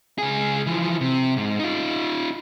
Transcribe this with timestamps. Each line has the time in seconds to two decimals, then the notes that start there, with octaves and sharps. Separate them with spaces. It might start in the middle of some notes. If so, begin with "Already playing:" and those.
0.18 C#2 G#4
0.66 E3 F3
1.01 C3
1.37 G#2
1.59 D#4 F4